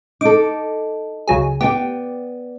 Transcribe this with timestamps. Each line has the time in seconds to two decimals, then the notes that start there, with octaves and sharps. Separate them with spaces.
0.21 D#4 A4 D6
1.28 C#2 F#3 G#4
1.61 B3 G4 D5 G5